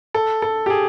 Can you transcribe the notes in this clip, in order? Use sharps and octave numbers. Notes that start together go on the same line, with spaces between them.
A4
A4
G4
G#4